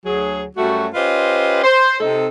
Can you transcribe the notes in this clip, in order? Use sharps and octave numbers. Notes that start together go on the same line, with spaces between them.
D2 F#3 G#4
F#2 G3 A3 F#4
C#4 F4 G4 B4 C5 D#5
C5
C3 D#4 A4